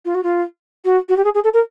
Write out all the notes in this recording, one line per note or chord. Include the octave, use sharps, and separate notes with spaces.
F4
F#4
F4
F#4
F#4
G4
G#4
G#4
A4
A#4